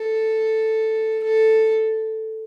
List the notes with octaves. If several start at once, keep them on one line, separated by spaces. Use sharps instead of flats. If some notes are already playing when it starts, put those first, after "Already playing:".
Already playing: A4
A4